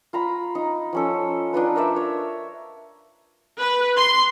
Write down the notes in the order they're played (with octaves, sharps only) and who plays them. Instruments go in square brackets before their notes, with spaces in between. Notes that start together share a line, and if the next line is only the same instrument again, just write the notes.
[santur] F4 A#5 B5
D#4
F3 C#4 A4
D4 D#4 F4 B4
A#4 C5 D5 E5
C#5
[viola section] B4
C6